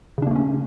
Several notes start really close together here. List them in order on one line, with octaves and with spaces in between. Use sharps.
C#3 D4 A#3 A3 C#4